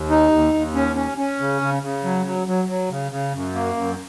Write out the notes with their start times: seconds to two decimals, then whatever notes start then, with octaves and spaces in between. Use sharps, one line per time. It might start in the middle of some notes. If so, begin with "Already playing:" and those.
Already playing: D#2
0.10 D#4
0.32 D#2
0.54 D#2
0.75 C#4
0.96 C#4
1.18 C#4
1.40 C#3
1.62 C#3
1.83 C#3
2.04 F#3
2.26 F#3
2.48 F#3
2.68 F#3
2.90 C#3
3.12 C#3
3.34 F#2
3.55 A#3
3.76 F#2